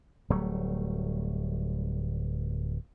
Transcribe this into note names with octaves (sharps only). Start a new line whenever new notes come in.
D1 F#3 G3 A3